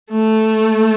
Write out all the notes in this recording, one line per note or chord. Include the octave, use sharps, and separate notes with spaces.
A3